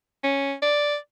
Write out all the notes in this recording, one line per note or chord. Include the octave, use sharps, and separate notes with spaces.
C#4
D5